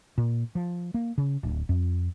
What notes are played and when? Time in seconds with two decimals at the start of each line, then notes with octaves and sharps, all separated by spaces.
0.18 A#2
0.55 F3
0.94 A#3
1.18 C#3
1.43 D1
1.69 F2